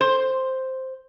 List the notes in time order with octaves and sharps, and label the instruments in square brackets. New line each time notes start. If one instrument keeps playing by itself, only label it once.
[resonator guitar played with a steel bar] C5